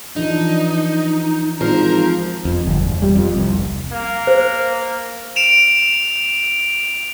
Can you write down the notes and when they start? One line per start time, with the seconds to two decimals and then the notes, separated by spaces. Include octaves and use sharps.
0.16 E3 F3 D4 D#4
1.61 G#1 F3 A#4
2.45 F2
2.66 G1
2.82 E1
3.02 G3
3.15 F2
3.37 C2
3.52 F1
3.92 A#3
4.27 C5
5.36 D7 E7 F7